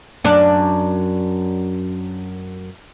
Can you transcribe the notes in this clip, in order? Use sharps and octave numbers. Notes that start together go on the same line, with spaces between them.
F#2 D4